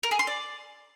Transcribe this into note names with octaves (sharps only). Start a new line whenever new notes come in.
A#4
G#4
C6
D5